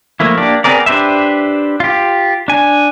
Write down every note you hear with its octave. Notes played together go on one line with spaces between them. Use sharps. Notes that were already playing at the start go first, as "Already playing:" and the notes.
F3 A3 A#3 E4
A#3 D4 G4 D5
B3 C4 G#4 A#4 D5
D4 G4 B4 C5 E5
F4 G4
D4 G#5